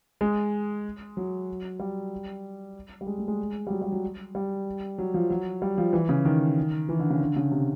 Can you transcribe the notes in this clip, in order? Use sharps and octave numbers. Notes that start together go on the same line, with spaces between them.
G#3
F#3
G3
G3
G#3
A3
G#3
G3
F#3
G3
F#3
G3
F#3
F3
F#3
G3
F3
E3
C#3
D#3
E3
D3
C#3
D3
C#3
C3